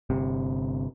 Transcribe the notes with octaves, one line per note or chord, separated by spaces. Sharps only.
G1 C3